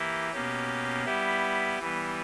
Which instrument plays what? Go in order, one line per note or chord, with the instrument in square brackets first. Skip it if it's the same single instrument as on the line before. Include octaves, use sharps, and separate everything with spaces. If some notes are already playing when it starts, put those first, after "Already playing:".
Already playing: [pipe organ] E3 A#3 E4 G4
B2 A#3 C#4 G4
G3 B3 E4 G4
E3 G3 B3